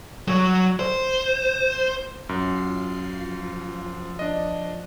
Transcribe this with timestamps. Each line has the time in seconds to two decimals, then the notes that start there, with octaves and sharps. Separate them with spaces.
0.28 F#3
0.79 C5
2.29 F#2 F4 C7
3.21 F3 F4
3.77 F3
4.19 D4 D#5